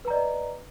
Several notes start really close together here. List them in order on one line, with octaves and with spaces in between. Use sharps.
B4 A#5 D5 D#5